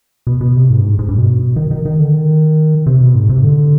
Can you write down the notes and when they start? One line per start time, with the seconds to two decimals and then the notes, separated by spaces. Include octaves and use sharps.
0.27 B2
0.41 B2
0.56 C3
0.70 G#2
0.80 G2
0.84 G#2
0.99 G#2
1.08 G2
1.18 B2
1.56 D#3
1.71 D#3
1.85 D#3
1.99 D3
2.14 D#3
2.86 C3
3.01 B2
3.15 G#2
3.29 C3
3.44 D3